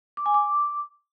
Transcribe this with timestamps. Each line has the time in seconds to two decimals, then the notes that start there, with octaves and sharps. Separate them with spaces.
0.17 D6
0.26 G#5
0.34 D6